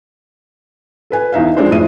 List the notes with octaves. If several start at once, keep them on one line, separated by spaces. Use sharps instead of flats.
A4 B4 G#5
E2 D#4 E5 F5
F3 G#3 C4 D4 C5
F2 A2 E5 D#7